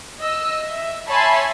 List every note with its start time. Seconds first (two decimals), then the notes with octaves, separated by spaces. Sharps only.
0.20 D#5 E6
0.62 E5
1.08 C#5 E5 G#5 A5 B5 C6